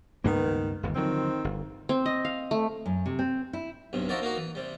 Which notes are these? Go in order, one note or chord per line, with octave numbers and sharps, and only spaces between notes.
C#2 G2 D#3 A#3 B3
G1 D#2
D3 D#3 F3 F#3 C4
G1
C4
D#5
F5
A3
F#2
C3
C4
E4
B1 G2 C3
F3 D#4 E4 F#4 A#4 D5
A#3 D#4 F#4 A#4
E3
C3 G3